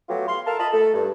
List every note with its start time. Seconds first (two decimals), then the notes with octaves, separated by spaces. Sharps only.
0.09 F#3 A3 B3 F4 G4
0.27 F5 C6
0.47 A4 A#4 F5 A5
0.60 F4 D#5 A5 B5
0.73 A3 A4
0.94 G2